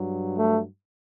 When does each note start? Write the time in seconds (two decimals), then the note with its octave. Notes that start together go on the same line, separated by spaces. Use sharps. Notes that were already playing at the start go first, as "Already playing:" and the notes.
Already playing: G2 F#3
0.37 A3